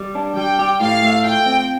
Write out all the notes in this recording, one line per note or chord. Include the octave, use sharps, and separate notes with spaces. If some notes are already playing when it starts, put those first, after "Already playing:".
Already playing: G3
D4
G3 G5
G4
A2 F5
A3
F4 G5
C4